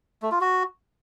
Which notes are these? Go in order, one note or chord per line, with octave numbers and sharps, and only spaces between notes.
A3
F4
F#4